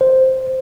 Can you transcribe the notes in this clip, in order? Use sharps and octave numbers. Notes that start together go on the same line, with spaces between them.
C5